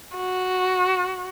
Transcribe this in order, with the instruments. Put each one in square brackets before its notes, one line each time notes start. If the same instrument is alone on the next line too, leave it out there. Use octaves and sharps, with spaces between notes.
[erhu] F#4